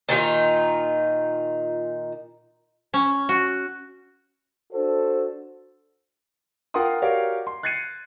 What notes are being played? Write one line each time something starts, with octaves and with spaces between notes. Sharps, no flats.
A#2 D#3 D#4 F4
C#4
F#4
D4 F#4 A4 C5
F4 A#4 F#5 G5 C6 D#6
F#4 G4 A#4 C#5 D5 F5
C6
F#6 G#6 A6 C7 C#7 D#7